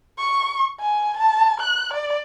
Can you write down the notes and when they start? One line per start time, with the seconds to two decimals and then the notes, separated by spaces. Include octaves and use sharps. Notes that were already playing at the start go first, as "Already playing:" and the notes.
0.19 C#6
0.80 G#5
1.17 A5
1.61 F#6
1.94 D5